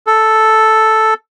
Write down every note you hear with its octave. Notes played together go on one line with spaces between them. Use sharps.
A4